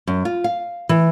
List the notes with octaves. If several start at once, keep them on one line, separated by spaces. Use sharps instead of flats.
F#2
F4
F5
E3